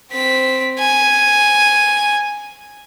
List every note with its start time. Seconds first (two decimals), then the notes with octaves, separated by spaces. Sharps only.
0.12 C4 B6
0.79 G#5